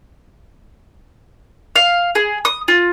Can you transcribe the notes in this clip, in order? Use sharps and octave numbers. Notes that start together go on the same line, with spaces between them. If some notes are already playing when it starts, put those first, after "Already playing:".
F5
G#4
D#6
F4